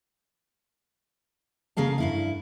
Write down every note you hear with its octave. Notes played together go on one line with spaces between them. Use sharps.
C#3 A#3 G#4 F5 A5
G2 E4 F5